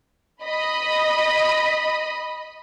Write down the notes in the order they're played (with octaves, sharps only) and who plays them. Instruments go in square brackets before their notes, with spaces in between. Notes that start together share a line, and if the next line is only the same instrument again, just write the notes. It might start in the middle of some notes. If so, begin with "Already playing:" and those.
[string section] D#5 B5